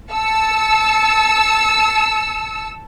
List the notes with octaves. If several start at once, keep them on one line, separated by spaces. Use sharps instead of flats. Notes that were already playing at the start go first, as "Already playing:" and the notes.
A5 E6 C#7